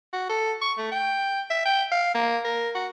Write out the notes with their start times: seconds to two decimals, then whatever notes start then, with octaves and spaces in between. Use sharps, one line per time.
0.13 F#4
0.29 A4
0.62 C#6
0.78 A3
0.92 G5
1.50 E5
1.65 G5
1.92 F5
2.15 A#3
2.45 A#4
2.75 F#4